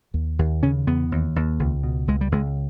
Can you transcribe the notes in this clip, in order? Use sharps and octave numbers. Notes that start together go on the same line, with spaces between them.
D#2
D#2
C#3 C#4
E2 B3
D#2
D#2
C#2
B2
C#2 G#3
G3
C#2 G#3